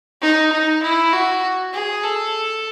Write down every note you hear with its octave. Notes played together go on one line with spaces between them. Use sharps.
D#4
D#4
E4
F#4
G#4
A4